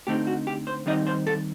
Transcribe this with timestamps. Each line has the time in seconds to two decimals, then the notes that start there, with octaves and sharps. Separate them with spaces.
0.07 D3 A3 C4 D#4 G4
0.27 F#4
0.47 G4
0.67 C5
0.86 D#3 G3 C4 D#4 D#5
1.07 C5
1.27 A4